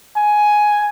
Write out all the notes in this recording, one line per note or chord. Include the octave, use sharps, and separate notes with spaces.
G#5